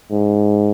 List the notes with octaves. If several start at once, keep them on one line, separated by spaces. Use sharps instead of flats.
G#2